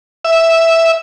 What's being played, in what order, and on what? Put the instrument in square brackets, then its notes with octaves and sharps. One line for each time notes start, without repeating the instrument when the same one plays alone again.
[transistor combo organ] E5